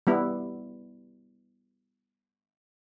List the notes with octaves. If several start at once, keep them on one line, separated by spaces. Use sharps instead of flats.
G3 B3 E4